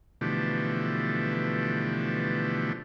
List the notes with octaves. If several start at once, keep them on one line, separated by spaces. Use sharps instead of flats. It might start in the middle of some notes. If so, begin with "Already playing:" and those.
B2 D3 E3 F3 A3 G4